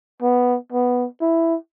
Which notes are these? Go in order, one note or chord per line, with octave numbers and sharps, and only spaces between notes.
B3
B3
E4